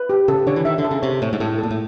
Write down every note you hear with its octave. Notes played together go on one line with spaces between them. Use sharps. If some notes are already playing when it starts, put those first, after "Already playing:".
Already playing: B4
G4
C#3 A4
D3 C#5
E3
D#3 E5
D3
A4
C#3
C3 C#5
A2 C#5
G#2
A2 A4
A#2 A4
A2